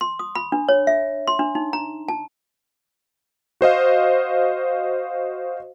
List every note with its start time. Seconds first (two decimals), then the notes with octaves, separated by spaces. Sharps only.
0.01 C6
0.19 D#6
0.35 B5
0.52 D4
0.69 C#5
0.87 E5
1.28 C6
1.39 D4
1.55 D#4
1.73 A#5
2.08 A5
3.61 F#4 C5 D#5 F5